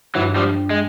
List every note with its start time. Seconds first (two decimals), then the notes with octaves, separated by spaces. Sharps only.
0.15 G2 E3 F#3
0.36 F3 G3
0.47 G3
0.70 G#3